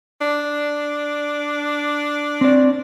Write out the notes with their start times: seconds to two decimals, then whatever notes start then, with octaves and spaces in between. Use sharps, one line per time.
0.21 D4
2.41 C4 D5